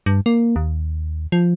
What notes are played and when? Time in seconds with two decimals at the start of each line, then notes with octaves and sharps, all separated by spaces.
0.06 G2
0.26 A#3
0.56 D#2
1.32 F3